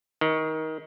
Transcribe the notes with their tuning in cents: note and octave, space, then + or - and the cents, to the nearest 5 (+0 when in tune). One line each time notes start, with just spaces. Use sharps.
D#3 +20